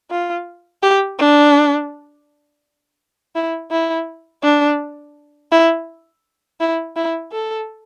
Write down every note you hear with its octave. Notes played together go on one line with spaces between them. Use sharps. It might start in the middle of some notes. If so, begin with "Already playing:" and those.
F4
G4
D4
E4
E4
D4
E4
E4
E4
A4